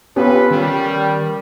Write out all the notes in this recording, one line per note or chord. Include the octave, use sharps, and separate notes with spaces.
B3 C#4 F4 G4 A4 B4
D#3 G3